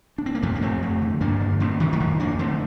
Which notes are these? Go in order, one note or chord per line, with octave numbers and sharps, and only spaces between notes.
D4
C4
A#3
F2 F3 A3
A#3
F2 A3 C4
F2
D3
G2 A#3 D4
D3
D3 A3 C4
D3 D#3 G3
D3
F2 D#3
F2 A#3 D4
D3 A3 C4